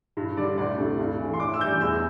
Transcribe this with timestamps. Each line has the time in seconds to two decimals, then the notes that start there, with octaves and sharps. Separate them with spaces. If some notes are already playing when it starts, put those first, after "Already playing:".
0.17 G2
0.37 D3 G3 D5
0.58 D2 D5
0.78 C3 A3
0.99 G2
1.19 E3 A3
1.34 C6
1.40 A2 D6
1.54 E6
1.61 E3 G3 G6
1.81 E2 E6